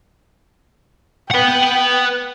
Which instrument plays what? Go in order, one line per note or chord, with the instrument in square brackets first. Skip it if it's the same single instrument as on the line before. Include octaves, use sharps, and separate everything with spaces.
[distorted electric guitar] B4 F#5 [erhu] G5